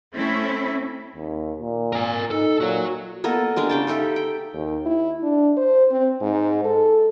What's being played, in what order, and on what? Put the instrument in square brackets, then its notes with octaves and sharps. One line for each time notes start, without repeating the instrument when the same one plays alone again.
[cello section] A3 C4 C#4 E4
[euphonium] D#2
A#2
[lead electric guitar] A#4 G#5
[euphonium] D#4 [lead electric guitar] A4
[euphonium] A#2 [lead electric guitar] F#4 C#5
[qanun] A#3 B3 A4 D#5
G3 G#3 D4 A#4
C#3 G5 A5
D#4 G4 A4 E5
G5
[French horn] D#2
E4
D4
C5
C4
G#2
A4